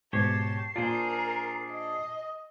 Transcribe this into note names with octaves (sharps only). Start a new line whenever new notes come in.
G#2 B2 G4 C#5 A5 C7
A#2 D4 F4 G#4 A#4 C5
D#5